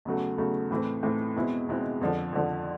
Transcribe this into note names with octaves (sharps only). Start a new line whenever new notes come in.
E2 C#3 F#3 A3
E2 C#3 F#3 A3
A2 E3 A3 C4
A2 E3 A3 C4
E2 B2 G#3 C4 E4
E2 B2 G#3 C4 E4
F2 D3 F3
F2 D3 F3